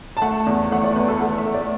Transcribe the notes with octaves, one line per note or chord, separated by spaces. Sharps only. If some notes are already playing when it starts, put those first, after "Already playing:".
A5
A3 F#5
E2
A3 F#5
D5
E2 B4
A4
A3 F#5
E5
A3
D5